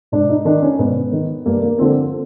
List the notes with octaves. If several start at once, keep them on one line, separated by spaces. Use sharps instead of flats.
G#2 D4
D#4
D#3 D4
C#4
G#2 B3
D#3
G2 A#3
A#3
D3 F3 C4